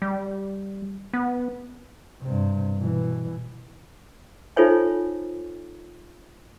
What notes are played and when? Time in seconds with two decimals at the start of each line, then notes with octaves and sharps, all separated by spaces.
0.02 G3
1.13 B3
2.22 G2 C3
2.77 B2 E3
4.56 D#4 F4 A4 C5 C#5 G#5